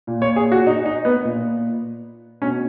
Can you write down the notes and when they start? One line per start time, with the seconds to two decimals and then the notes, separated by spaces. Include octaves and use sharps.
0.07 A#2
0.22 C#5
0.36 G#4
0.52 F#4
0.67 D#4
0.86 D#4
1.05 B3
1.24 A#2
2.42 B2 C#4